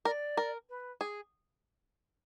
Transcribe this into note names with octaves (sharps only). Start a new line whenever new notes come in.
A#4 D5
A#4
B4
G#4